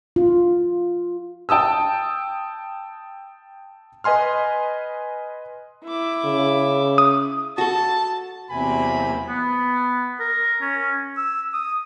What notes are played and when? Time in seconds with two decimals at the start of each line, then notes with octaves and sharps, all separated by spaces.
0.16 F4
1.49 G5 A5 D#6 E6
4.04 B4 D#5 G#5 C6 F6
5.85 E4 D6
6.25 C#3
6.98 D#6
7.58 F#4 A4 A5
8.51 E2 C3 F#3 A#3 C4 G#5 B5
9.28 B3
10.20 A#4
10.61 C#4
11.17 E6
11.53 D#6